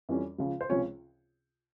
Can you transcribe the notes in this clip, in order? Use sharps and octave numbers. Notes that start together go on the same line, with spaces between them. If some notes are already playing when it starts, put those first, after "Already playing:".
F2 E3 G3 C#4
C#2 C#3 F3
C5
C#2 C3 F3 C#4 C#5